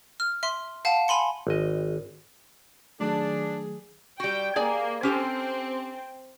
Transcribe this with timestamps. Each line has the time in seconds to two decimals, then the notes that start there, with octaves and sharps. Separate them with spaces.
0.20 F6
0.43 E5 C6
0.85 F5 F#5 A5
1.08 G#5 B5 C6 C#7
1.47 G#1 D#5
3.00 D#3 F#3 A3 D4 G#4
4.20 G3 F#4 G5
4.56 A#3 G#4 D5 G#5
5.03 C4 C#4 G4 A4